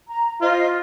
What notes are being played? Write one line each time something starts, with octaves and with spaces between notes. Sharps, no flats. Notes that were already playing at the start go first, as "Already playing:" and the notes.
A#5
F4 C5 D#5